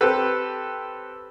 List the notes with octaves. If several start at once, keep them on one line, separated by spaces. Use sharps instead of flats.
C4 G4 A4 B4